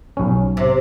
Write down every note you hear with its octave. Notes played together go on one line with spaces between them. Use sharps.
B1 C#4
C3